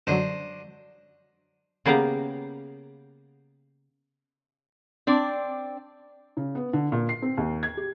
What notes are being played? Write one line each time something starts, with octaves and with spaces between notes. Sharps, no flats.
F#2 D3 F#3 D4 C5 D#5
C#3 A#3 B3 G4 F5 A#5
C4 D4 D5
C#3
B3
D3
A#2
C7
C4
D#2
G#6
G4